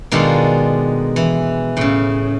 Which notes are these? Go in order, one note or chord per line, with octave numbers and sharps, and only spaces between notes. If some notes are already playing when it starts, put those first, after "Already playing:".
B2 D#3 G#3 D4 F4 A4
E3
A2 C#3